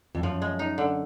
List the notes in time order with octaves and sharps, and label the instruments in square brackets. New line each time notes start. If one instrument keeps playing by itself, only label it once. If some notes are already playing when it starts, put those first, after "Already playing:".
[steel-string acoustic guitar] F2
[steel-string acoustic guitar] F#2 [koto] F3
[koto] G#3
D#4
D3